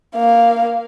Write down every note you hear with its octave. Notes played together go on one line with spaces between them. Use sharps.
A#3 F5